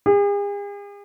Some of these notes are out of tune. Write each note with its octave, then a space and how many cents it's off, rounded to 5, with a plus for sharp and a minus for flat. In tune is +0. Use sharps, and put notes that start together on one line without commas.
G#4 -45